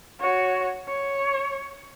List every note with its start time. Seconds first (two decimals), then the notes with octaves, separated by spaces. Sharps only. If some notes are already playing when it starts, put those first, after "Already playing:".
0.20 F#4 C#5
0.88 C#5